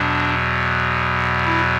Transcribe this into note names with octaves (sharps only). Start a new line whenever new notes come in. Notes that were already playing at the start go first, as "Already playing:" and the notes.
Already playing: E2 B2 F#3 D4
E4